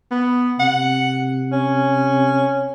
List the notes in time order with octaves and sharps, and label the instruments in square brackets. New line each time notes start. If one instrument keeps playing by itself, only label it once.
[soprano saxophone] B3
[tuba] C3 [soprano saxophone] F#5
[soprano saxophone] C#4